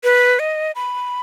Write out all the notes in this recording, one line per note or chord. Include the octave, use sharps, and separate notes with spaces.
B4
D#5
B5